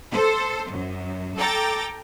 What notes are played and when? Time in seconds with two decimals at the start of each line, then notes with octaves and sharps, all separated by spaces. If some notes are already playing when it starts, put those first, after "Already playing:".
0.12 A4 C5
0.71 F#2
1.37 A4 G5 A#5 D6 A6